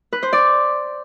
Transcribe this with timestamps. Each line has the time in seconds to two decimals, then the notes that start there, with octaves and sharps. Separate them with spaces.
0.13 B4
0.23 C5
0.33 D5